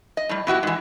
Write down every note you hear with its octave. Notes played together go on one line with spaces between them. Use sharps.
D#5
A2 G3
B2 E4 F#4 G4
G#2 E3